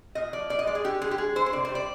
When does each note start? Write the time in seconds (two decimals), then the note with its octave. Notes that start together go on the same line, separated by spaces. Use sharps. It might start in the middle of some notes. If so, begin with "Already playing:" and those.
0.15 A#2 D#5
0.33 F3 D5
0.50 A#2 D5
0.59 D#5
0.66 G#3 D5
0.75 G#4
0.84 D3 G4
1.01 G#3 G#4
1.11 G4
1.18 G#3 G#4
1.35 D3 C5
1.46 C5
1.53 C3 D5
1.65 G3 C5
1.75 D5